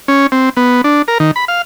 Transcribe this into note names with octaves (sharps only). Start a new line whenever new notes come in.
C#4
C4
B3
D4
A#4
D#3
B5
F5